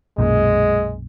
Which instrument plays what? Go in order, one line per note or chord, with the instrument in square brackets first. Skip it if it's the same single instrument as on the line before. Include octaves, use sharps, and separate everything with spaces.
[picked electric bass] B1 F#2 A#2 [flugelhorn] G#3